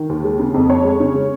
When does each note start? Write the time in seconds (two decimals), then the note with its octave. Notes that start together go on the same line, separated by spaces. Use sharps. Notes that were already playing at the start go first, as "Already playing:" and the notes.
Already playing: D#3
0.09 D#2
0.24 G#3
0.40 C#3
0.54 F2
0.69 F2 C#5
0.84 G#3
1.00 C#3
1.15 G#3